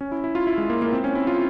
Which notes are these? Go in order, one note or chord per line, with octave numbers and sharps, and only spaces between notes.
C#4
E4
E4
F4
E4
G#3
A#3
A#3
C4
C#4
E4
F4